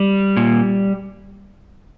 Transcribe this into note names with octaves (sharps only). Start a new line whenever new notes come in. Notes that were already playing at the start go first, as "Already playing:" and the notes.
Already playing: G3
A#2